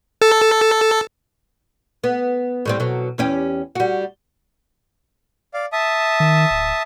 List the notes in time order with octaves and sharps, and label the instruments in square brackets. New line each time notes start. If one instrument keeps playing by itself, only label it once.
[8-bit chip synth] A4
[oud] B3
A2 G3 C4
B2 F#3
E2 C#4 G4
G3 F#4
[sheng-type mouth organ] D5 F5
E5 A5 D#6
[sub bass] D#3
D1